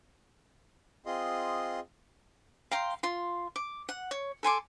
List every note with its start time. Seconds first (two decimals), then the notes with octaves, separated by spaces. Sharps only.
1.06 C4 F4 G#4 D#5 C6
2.71 F5 G5 A#5 C6
3.03 F4 C6
3.56 D6
3.89 F#5
4.11 C#5
4.43 A4 G#5 C6 D6